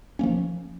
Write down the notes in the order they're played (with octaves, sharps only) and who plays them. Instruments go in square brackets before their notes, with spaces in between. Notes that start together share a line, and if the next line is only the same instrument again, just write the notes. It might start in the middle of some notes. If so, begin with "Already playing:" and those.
[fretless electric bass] F3 A#3 C#4